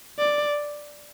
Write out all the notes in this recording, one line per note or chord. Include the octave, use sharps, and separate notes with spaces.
D5